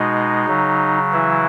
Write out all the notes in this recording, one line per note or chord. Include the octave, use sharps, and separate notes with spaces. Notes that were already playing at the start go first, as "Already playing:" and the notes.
Already playing: B2 G#3 D#4
C#3 F#3
E3 E4